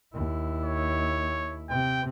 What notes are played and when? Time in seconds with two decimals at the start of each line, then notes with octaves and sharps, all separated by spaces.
0.14 D#2 E4
0.64 C#5
1.69 C3 G5